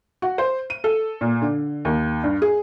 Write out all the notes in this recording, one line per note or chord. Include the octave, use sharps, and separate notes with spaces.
F#4
C5
D#7
A4
A#2
D3
D#2
G2
G#4